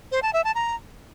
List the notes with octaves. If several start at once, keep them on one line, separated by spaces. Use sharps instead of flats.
C5
A5
E5
A5
A#5